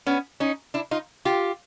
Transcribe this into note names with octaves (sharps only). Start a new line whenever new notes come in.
B3 C#4
C#4 D#4
D4 E4
D#4 F4
F4 G4